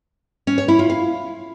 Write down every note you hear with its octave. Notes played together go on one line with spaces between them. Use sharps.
C#4
C#5
E4
F4
F5